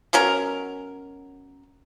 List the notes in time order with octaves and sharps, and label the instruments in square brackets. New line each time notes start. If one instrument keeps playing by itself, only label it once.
[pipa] B2 F#3 C#4 A#4